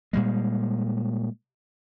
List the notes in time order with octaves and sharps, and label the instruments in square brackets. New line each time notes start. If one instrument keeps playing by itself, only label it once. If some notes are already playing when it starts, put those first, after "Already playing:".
[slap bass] A#2 G3 G#3